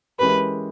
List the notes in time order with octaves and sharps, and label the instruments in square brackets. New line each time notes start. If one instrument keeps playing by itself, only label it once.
[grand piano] E3 G#3 C#4 G4 A#4 [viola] B4